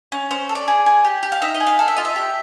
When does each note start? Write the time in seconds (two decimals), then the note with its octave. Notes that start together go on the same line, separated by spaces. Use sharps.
0.12 C#4
0.31 C#4 C5
0.49 A4
0.55 D5
0.68 G#4
0.86 G#4
1.05 G4
1.23 G4
1.32 F5
1.42 D#4 E5
1.54 D#5
1.60 G#4
1.67 F5
1.79 A4 F5
1.88 E5
1.96 F4 D#5
2.05 E5
2.16 G4